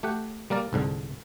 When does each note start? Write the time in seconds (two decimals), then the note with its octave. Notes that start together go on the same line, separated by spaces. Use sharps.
0.03 A3 G4 F#5
0.50 G3 A#3 A#4 D5
0.73 C2 G#2 D3